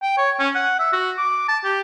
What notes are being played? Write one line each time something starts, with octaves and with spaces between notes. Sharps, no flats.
G5
C#5
C#4
F#5
E5
F#4
D6
A5
G4